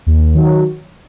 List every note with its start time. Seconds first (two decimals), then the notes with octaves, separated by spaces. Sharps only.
0.06 D#2
0.35 D#3 F#3